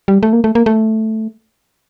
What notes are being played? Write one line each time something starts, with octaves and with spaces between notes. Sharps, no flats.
G3
A3
A#3
A3
A#3
A3